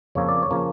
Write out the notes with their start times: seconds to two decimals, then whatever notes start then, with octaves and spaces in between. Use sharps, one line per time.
0.15 F2 C#3 F3 A#3 C#5
0.29 D5
0.43 C#5
0.51 C#3 F3 A#3